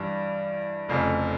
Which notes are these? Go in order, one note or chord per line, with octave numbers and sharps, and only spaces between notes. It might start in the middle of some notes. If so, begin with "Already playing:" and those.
Already playing: G2 E3 G3
F1 F2 C#3